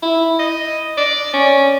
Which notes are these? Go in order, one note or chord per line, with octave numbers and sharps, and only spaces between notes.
E4
D#5
D5
C#4